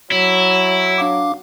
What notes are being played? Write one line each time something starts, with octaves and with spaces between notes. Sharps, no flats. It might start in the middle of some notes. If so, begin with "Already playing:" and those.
F#3 E4
D4 F5 D6